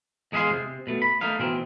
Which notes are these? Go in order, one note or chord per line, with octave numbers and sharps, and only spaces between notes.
E2 G#3 G#4 E5 F5 C6
C3
B2 A3
B5
A3 A#3 D#4 F5
B2 E3 C4